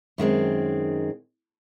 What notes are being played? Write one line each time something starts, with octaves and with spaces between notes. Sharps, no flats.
F#2 D#3 G#3 C4